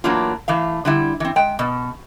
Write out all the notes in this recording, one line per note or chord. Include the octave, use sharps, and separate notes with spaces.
E3 F#3 A3 A#3 D4 F4
E3 A3 F5
D3 G3 E4
E3 C4
G#3 G5
B2